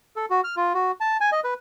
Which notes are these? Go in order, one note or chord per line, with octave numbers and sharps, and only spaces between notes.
A4
F#4
F6
F4
F#4
A5
G#5
D#5
B4